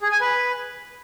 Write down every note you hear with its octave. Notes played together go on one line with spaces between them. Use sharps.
G#4
G#5
B4